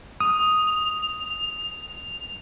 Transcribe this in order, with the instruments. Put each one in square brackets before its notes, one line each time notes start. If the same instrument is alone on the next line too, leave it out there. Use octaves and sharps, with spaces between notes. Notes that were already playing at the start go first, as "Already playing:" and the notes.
[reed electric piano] D#6 [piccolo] F7